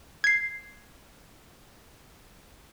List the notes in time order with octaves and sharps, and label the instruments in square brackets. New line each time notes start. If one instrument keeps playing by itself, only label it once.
[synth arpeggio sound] G#6 C7